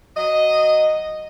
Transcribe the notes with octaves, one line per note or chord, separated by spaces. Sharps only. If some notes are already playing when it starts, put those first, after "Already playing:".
F#3 D#5